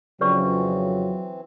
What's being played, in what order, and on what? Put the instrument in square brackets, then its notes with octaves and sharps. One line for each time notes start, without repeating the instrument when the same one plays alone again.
[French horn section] F2 C#3 [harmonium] E3 C4 [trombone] F#3 [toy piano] B4 D5 C#6